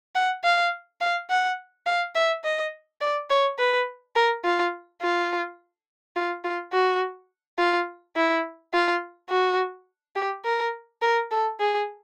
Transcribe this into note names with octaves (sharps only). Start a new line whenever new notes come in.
F#5
F5
F5
F#5
F5
E5
D#5
D5
C#5
B4
A#4
F4
F4
F4
F4
F#4
F4
E4
F4
F#4
G4
A#4
A#4
A4
G#4